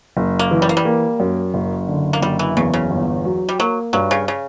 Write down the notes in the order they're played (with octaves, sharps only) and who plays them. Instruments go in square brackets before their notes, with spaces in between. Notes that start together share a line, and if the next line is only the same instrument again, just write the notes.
[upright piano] F#1
[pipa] A#3
[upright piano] E3
[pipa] G3
A#3
G3
[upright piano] A#3
F#2
F#1
D3
[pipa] A#3
[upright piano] F#1 [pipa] G3
[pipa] E3
[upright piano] E2 [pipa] C#3
[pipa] C#3
[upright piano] G1
F#3
[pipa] G3
[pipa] F#3 [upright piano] A#3
[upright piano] G2 [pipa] F#3
[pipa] C#3
C#3